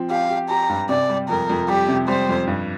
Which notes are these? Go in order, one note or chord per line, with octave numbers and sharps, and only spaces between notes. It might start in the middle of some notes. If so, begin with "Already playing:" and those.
Already playing: F3 C4
G4 F5
G4
G4 A#5
G2
C3 D5
G3
F2 A#4
F2
G3 G4
C3
G3 C5
F2
G2